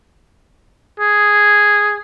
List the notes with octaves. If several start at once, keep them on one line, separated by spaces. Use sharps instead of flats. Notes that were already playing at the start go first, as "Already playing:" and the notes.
G#4